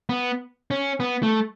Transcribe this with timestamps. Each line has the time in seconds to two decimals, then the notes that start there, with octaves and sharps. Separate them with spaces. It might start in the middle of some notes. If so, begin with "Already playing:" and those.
0.09 B3
0.71 C#4
1.00 B3
1.23 A3